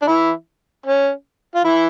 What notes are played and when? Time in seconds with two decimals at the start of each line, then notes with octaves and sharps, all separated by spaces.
0.02 D4
0.07 E3 E4
0.86 C#4
1.55 F4
1.64 E3 E4